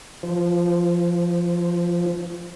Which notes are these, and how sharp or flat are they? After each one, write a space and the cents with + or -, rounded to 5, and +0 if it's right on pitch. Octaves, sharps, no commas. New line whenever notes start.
F3 -10